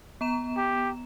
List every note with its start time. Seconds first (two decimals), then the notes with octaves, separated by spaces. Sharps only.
0.21 B3 A#5 E7
0.57 G4